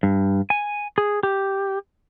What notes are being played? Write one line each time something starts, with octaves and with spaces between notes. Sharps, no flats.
G2
G#5
G#4
G4